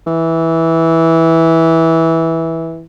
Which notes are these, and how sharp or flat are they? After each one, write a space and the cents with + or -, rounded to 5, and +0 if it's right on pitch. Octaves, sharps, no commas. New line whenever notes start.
E3 -10